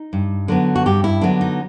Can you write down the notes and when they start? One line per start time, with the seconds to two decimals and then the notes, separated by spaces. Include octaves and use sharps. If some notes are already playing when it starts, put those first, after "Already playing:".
Already playing: D#4
0.13 G2
0.48 D3 F#3 B3
0.75 F#4
0.86 G2 G4
1.04 E4
1.21 D3 F#3 B3 D4
1.41 D#4